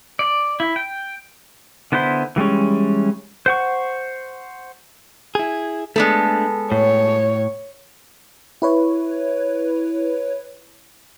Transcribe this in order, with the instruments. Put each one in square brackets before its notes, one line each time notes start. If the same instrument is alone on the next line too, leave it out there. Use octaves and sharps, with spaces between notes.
[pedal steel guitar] D5
E4
G5
D3 B3 E4 C5 C6
E3 G3 G#3 C#4
C5 F#5 C#6
[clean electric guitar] E4 G#4
[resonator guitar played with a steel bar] G#3 B3 A4 [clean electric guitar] A3 D4
[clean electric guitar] A2 [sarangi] C#5
[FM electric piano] E4 B4 C#5